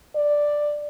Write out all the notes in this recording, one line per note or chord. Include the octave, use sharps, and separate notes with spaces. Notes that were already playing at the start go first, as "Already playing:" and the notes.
D5